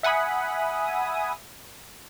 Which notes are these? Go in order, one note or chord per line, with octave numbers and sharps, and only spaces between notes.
E5 F#5 G#5 B5 D#6